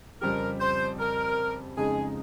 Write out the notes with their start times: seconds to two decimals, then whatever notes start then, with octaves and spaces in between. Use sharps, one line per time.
0.21 F2 C#3 G3 C4 G4 A#4
0.60 C5
0.99 A#4
1.77 F2 C#3 G#3 D#4 G#4